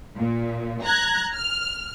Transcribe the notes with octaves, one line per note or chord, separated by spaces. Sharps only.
A#2
A#5 F#6 G#6
F6